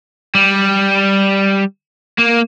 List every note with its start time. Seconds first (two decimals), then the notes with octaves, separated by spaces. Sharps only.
0.35 G3
2.19 A#3